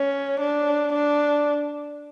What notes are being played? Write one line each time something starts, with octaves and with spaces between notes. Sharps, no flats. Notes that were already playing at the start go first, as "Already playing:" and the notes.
Already playing: C#4
D4
D4